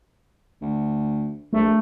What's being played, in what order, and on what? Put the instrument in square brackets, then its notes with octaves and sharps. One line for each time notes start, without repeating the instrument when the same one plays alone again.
[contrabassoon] D2
[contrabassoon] A#1 [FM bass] A3